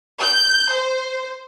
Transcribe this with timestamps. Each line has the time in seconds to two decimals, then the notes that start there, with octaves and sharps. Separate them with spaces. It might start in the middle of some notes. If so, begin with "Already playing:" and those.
0.19 G6
0.72 C5